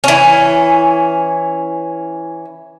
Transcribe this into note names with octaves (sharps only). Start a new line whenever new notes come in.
E3 C#4